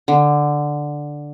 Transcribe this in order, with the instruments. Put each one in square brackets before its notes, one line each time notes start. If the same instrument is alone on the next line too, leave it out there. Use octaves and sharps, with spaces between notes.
[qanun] D3